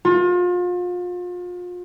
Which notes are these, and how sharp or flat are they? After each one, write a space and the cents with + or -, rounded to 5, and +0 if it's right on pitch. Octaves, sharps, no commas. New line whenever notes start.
F4 +35